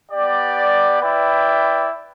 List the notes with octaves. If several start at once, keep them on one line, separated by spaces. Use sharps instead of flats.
B3 G4 D5
E4 B4 D5 G5